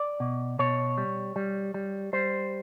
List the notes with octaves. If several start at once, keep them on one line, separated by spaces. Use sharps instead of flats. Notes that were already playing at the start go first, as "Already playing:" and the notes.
Already playing: D5
B2
B2 C#5
G3
G3
G3
G3 C5